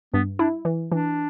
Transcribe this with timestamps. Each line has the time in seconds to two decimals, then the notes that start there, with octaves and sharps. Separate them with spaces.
0.14 G2 B3
0.39 D4 E4
0.65 E3
0.92 E3 D4